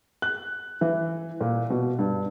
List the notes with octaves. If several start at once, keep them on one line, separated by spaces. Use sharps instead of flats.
F#6
E3
A#2
B2
G2